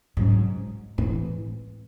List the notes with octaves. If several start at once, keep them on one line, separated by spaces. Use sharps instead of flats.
G#2 C3 F#3 C#4
A2 E3 G#3 C4